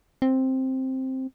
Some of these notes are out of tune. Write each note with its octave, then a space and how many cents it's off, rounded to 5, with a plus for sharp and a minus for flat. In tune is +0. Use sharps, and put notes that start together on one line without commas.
C4 +5